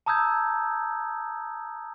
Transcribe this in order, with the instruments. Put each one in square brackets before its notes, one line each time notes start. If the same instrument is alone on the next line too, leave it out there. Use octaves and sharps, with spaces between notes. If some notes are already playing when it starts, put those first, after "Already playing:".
[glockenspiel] A5 A#5 D#6 E6 G6 G#6